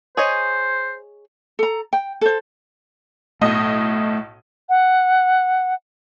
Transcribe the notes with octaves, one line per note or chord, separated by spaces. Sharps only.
G#4 C5 C#5 D#5
A4 A#5
G5
A4 C5
B1 A2 A3 D#5
F#5